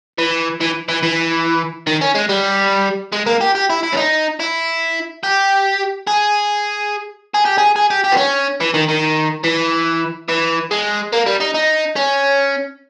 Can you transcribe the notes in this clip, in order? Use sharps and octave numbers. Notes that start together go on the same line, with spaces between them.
E3
E3
E3
E3
D#3
C#4
G#3
G3
G#3
A#3
G4
G4
E4
E4
C#4
D#4
E4
G4
G#4
G#4
G4
G#4
G#4
G4
G4
B3
C#4
E3
D#3
D#3
E3
E3
G#3
A#3
G3
D#4
D#4
C#4